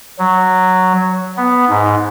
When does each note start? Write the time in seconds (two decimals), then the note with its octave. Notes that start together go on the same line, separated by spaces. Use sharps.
0.19 F#3
1.37 B3
1.69 G#2